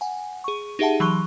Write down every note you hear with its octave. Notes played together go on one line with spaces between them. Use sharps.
F#5 G#5
G#4 C#6
D#4 G4 G#4 E5 F#5 A5
E3 F#3 C6 C#6 G7